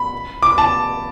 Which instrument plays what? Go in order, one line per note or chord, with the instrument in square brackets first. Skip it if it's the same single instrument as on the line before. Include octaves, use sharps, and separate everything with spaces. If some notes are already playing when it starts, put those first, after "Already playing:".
Already playing: [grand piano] B5
D6
A5